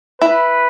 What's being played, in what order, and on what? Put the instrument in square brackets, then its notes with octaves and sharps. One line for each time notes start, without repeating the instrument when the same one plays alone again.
[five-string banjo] E4 [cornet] B4